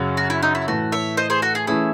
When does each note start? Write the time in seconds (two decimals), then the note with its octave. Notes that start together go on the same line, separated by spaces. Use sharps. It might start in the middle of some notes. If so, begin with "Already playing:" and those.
Already playing: F#2 C#3 F#3 C#4
0.17 F#4
0.30 E4
0.43 D#4
0.55 E4
0.68 A2 E3 A3 F#4
0.92 C#5 E5
1.17 C5 D#5
1.30 G#4 C5
1.42 F#4 A4
1.55 G#4
1.67 E3 A3 C#4 E4 G#4